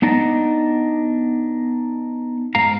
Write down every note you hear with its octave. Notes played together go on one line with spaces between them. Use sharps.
B3 D4 D#4 D5 D#5
G#2 F5 A#5